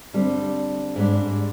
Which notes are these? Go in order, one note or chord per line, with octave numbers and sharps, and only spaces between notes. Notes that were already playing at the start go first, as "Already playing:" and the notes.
D3 G3 C4
G#2 G3 D4